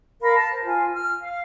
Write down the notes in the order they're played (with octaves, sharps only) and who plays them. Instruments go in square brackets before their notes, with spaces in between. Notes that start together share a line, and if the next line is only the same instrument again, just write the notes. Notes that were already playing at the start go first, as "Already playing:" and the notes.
[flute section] A#4 F5 B5
A5
C5
F4 G#5
F6
F5